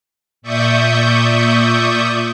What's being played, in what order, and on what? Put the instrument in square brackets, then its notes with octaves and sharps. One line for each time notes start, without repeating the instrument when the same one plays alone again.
[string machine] A#2 D5 E5 C#6 D#6 G6